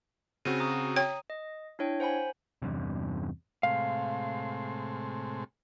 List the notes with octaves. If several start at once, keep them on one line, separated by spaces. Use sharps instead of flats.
C#3 C4 F#4 D#7
A#5 D#6
C#5 G5
D#5
D4 E4 C#5 G5
C5 F#5 G#5 B5
E2 G2 C3
A2 C3 G#3 F5